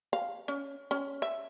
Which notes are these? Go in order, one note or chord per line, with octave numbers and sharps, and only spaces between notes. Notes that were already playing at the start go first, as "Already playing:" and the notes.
F5
C#4
C#4
E5